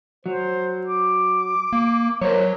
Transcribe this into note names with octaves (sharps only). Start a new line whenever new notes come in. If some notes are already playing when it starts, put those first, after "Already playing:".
F#3 C5
D6
A#3
F#3 A#4 C5 C#5